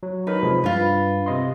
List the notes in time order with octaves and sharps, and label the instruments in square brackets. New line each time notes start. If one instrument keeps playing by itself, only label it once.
[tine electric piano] F#3
[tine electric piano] F#3 D#4 A#4 [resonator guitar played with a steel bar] B4
[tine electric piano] C3 F3 G#3
[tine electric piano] G2 [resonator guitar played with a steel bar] F4 B4
[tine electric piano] C3 D#5 C6